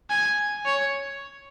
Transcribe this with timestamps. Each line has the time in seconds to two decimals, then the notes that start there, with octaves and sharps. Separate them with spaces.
0.10 G#5
0.66 C#5